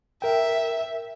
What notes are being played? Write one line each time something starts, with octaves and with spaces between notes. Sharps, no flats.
A#4 E5 G5